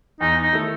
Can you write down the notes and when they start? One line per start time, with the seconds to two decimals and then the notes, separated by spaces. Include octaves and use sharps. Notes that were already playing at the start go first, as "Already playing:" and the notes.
0.21 E2 D#4
0.41 D#4
0.53 D#3 A3 E4 A4